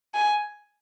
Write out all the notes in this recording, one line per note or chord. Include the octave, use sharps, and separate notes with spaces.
G#5